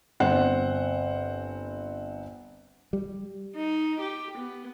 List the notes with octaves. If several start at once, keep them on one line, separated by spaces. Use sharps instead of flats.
G1 C4 C5 F#5
G3
D#4
G4
B3